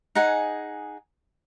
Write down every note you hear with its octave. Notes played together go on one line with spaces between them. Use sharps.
D#4 G#4 F#5 G#5